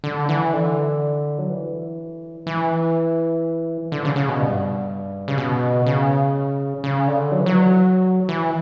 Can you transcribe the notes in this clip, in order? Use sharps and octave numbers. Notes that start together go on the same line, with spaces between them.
D3
E3
D3
F#3
E3
E3
D3
C#3
C#3
B2
G2
C#3
B2
C#3
C#3
D3
F#3
E3
F#3
E3